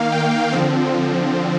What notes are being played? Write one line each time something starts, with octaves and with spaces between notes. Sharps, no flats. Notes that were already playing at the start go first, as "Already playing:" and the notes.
Already playing: D#3 A#3 F5
G5
D3 F3 C4